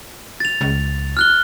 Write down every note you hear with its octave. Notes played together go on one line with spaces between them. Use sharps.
A6 F7
C#2
F6 F#6 G7